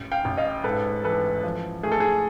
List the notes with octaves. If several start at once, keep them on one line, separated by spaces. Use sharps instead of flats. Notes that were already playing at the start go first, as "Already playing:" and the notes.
Already playing: A1
F5 G5
A1
D#5 F5
G#2 A4 B4
E3 A4 B4
F3
A3 G#4
A4
G#4